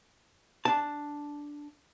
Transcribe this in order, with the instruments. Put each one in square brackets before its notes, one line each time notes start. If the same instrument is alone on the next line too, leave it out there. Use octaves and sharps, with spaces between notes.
[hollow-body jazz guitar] D4 A5